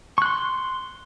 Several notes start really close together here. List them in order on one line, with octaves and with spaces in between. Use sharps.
C#6 F#6 C6